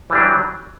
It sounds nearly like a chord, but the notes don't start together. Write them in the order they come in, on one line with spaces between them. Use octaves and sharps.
E3 G3 D4 F#3